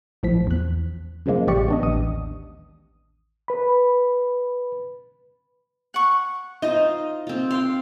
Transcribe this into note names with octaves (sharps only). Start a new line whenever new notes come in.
A#1 A2 F3 B6
E2 F#6
F#2 C#3 F3 G#3 A#3
A1 G#3 G4 D5 C#6 C#7
B3 D4 D#5
A1 D#2 D#6
B4 B5
F#5 C#6
D#4 F4 C5 D#5
C4 F4
F5 G5 C6